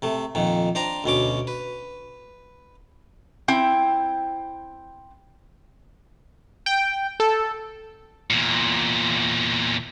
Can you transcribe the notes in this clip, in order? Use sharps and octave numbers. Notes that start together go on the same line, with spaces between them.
C3 A3
F2 A#2 D#3
D4 C5 G5 A#5
D2 B2 C#4 D6
B4
C4 E4 G5
G5
A4
E2 A#2